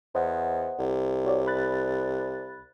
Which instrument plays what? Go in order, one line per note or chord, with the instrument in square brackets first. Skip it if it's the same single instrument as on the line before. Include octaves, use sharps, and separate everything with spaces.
[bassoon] E2 [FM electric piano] C5 D#5 F#5
[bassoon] C2
[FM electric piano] F#4 C#5 D5
B5 F#6 A6